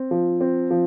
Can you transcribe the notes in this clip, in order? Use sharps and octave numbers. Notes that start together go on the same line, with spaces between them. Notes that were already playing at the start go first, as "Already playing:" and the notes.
Already playing: C4
F3
C4
F3